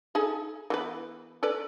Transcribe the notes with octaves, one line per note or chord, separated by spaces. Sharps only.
D#4 G#4 A4
E3 B3 B4
A4 B4 D5